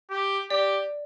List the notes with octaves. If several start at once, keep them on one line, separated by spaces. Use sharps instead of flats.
G4
G4 D5